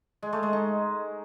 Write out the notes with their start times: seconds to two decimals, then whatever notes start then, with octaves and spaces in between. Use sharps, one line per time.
0.22 G#3
0.33 A3
0.43 G#3
0.53 D#4